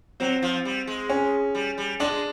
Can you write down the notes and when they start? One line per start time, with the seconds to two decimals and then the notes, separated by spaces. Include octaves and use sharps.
0.20 F#3 C4
0.43 F3
0.65 G3
0.87 G#3
1.09 C#4
1.55 G3
1.78 G3
2.00 G#3 D4
2.12 G#3